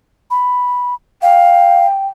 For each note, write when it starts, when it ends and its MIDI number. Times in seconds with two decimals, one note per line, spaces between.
0.31 0.94 83
1.22 1.86 77
1.22 2.08 79